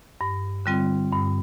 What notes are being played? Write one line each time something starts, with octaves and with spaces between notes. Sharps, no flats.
G2
D3 G3 C4 F4
G2